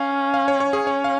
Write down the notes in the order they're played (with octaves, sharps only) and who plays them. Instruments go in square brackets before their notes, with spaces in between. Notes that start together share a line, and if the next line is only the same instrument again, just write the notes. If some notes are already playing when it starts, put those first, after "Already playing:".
Already playing: [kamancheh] C#4 [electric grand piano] F5
[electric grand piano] F5
C#5
C#5
G#4
[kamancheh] C#4 [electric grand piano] C#5
[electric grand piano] F5